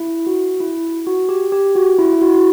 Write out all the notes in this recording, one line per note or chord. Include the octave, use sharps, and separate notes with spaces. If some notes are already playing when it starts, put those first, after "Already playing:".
Already playing: E4
F#4
E4
F#4
G4
G4
F#4
E4
E4
F#4
F#4